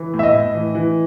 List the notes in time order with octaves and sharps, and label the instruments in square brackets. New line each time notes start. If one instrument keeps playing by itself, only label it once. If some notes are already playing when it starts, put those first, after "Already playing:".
Already playing: [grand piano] E3
A2
E5
D#5
A2
E3
E3